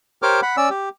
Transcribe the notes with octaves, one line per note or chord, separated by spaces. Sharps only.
G4 A#4 C5 C#5 D6 F6
F#5 B5
C#4 D5 E6
G4